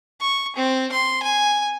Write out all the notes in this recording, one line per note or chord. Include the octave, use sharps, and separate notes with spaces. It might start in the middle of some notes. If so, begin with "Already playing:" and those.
C#6
C4
C6
G#5